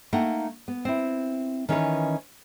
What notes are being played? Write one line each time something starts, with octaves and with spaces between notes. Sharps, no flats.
A3 A#3 D#4 F#5 G5
B3
C4 E4
D#3 E3 C#4 D#4 A#4 B4